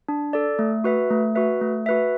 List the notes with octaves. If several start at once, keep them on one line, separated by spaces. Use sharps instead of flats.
D4
A4 D5
A3
F#4 B4 E5
A3
F#4 B4 E5
A3
F#4 B4 E5